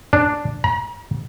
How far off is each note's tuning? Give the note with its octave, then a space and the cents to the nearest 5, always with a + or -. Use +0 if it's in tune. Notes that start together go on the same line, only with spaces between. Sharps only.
D4 +0
A#5 +45